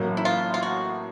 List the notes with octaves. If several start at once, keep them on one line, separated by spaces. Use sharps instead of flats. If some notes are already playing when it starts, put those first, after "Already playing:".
Already playing: A1 A2 F#3 A#3
E4
F4
F4
F#4